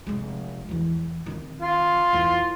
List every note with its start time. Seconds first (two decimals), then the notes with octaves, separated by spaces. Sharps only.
0.07 F1 G#3
0.69 E2 E3
1.26 D#3 C4
1.62 F4
2.13 E2